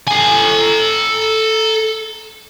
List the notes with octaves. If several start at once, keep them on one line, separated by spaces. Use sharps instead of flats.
A4 G#5